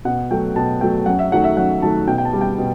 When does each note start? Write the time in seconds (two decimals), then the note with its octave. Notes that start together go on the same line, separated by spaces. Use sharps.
0.05 B2 F#5
0.31 F#3 A3 G5
0.56 B2 A5
0.81 F#3 A3 G5
1.06 F#2 F#5
1.19 E5
1.32 D#3 F#3 A3 F#5
1.44 E5
1.57 F#2 F#5
1.82 D#3 F#3 A3 A5
2.07 B2 G5
2.18 G5
2.25 A5
2.33 G3
2.41 G5
2.58 B2